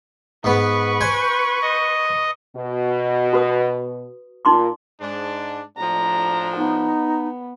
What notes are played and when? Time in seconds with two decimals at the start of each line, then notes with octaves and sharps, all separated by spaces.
0.44 G#2 B3 B4 C#6
1.01 C5 G5 G#5
1.62 D#5
2.55 B2
3.33 F#4 B4 D#6
4.45 A#2 D#4 C6 D6
5.01 G#2 D4
5.78 A2 F3 D4 A#5
6.57 B3 D#4